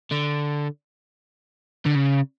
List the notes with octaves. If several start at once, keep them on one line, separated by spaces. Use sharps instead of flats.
D3
D3
C#3